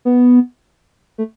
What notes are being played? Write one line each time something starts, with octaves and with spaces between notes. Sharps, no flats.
B3
A3